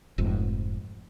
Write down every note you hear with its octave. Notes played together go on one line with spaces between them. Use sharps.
F1 F2 G#2